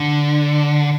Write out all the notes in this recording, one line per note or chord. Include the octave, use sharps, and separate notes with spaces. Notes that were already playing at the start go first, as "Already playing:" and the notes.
Already playing: D3